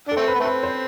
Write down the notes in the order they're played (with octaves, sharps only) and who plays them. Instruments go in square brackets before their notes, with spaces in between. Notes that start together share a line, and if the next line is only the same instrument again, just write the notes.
[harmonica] D4 [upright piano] A4
[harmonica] A3 C4
[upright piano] B4
[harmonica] B3
A3 C4
[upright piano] B4
C5